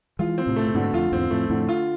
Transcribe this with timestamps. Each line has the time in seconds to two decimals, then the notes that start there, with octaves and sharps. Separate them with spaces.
0.19 E3 G#3 F4
0.38 C4
0.47 A2 C3
0.56 A3
0.67 C3
0.74 G#2 B2 D3
0.94 F2 F4
1.12 E2 G#2 C4
1.31 F2 A2 A3
1.50 F2 A2 D3
1.69 F4